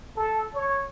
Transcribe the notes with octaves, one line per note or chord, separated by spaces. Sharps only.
A4
C#5